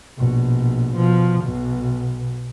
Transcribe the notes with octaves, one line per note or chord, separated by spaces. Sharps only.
A#1 B2
B2 F3
B1 B2